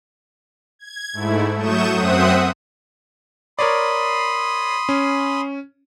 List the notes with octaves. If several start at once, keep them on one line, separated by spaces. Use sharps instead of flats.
G#6
G#2 A3 E4
F#3 A3 C#6 D#6 G6 E7
F#2 C4 C5 E5 F#5 D#6
A#4 C#5 D5 B5 C6 D#6
C#4